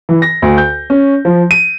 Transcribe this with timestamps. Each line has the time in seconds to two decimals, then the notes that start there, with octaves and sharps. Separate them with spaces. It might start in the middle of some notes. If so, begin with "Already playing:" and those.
0.09 E3
0.22 A#6
0.42 D2
0.58 G6
0.90 C#4
1.25 F3
1.51 D#7